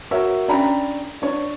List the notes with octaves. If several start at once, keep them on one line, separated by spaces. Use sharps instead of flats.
F#4 A#4 C#5 E5
C#4 D4 G5 A#5 B5
D4 C#5